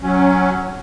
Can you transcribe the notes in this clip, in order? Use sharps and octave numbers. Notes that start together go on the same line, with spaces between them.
F#3 C#4